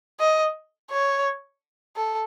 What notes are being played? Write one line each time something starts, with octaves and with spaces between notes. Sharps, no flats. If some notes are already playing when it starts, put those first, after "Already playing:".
D#5
C#5
A4